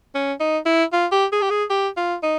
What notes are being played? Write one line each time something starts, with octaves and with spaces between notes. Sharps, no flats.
C#4
D#4
E4
F4
G4
G#4
G4
G#4
G4
F4
D#4